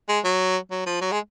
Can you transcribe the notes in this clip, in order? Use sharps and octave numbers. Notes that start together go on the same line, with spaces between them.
G#3
F#3
F#3
F3
F#3
G#3